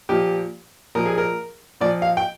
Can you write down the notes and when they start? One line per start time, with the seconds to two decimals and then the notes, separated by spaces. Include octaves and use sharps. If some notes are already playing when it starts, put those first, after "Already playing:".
0.09 A#2 F3 G4
0.95 A#2 F3 A#4
1.06 G#4
1.18 A#4
1.81 A#2 F3 D5
2.02 F5
2.17 G5